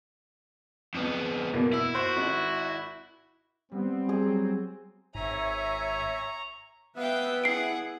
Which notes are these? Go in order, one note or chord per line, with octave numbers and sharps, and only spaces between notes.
F2 B3
E2 B2 A#3
E4 E6
F#4 C5
G#1
G3 B3 C4
F#3 B3 G#4
G#1 G#2 C#5 E5 G#5 A#5 C#6
B3 B4 E5 F5 G5
E4 G#4 F#5 C7 D7